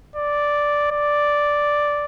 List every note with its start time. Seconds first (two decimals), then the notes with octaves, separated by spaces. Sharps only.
0.16 D5
0.91 D5